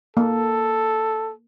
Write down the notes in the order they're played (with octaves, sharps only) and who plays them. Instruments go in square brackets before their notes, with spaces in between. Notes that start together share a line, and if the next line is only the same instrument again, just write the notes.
[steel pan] A#3 [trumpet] A4